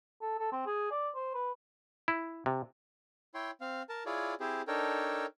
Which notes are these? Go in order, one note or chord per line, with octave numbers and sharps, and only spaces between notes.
A4
A4
C4
G#4
D5
C5
B4
E4
C3
E4 C#5 G5 C6
C4 F5
A#4 A5
E4 F4 G#4 C#5 D5
C4 E4 G4 G#4 C5
D4 D#4 A4 A#4 C#5 G5